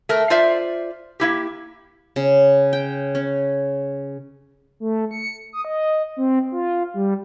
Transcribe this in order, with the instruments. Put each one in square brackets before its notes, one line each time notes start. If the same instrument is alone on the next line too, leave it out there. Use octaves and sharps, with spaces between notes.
[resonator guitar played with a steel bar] A3 A#4
F4 C5 D5 E5
A#3 E4 G4
[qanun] C#3
G5
C#4
[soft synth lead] A3
C#7
D#6
D#5
C4
F4
G3